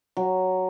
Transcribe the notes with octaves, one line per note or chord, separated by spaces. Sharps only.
F#3